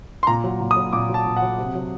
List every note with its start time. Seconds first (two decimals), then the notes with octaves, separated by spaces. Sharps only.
0.23 C6
0.27 A#2 A#5
0.44 F#3
0.61 A#2
0.71 D#6
0.76 F#3
0.93 A#2 D6
1.09 F#3 A5
1.26 A#2
1.36 F#5
1.42 F#3
1.58 C3
1.75 F#3